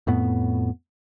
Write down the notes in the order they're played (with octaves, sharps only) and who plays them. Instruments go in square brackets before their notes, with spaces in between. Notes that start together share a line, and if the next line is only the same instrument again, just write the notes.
[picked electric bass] F2 A2 B3